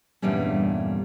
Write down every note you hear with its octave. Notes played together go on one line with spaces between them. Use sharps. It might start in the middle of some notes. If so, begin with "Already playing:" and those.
E2 G2 A#2 G3 A3 C#4